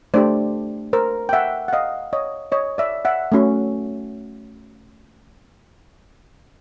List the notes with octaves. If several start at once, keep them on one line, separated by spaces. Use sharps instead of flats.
A3 D4 G4 C5 D5
A#4 C5
G5
E5 F#5
F#5
D#5 F5
C#5 D#5
C#5 D#5
D5 E5
E5 F#5
A3 C#4 F#4